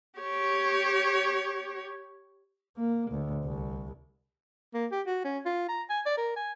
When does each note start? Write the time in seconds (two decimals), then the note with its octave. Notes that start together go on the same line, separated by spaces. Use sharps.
0.20 G4 C#5
2.77 A#3
3.11 D2
3.44 C2
4.74 A#3
4.92 G4
5.07 F#4
5.25 C#4
5.46 F4
5.68 A#5
5.89 G#5
6.06 D5
6.18 A#4
6.36 G#5